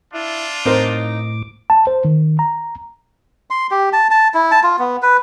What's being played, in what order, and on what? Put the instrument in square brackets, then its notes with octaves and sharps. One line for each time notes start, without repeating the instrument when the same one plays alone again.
[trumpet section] D4 F4 [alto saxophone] E4
[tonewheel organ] A2 D6 [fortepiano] C4 A#4 C5 [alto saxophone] D#4
[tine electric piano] A5
C5
D#3
A#5
[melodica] C6
G4
A5
A5
E4
A5
F4
B3
B4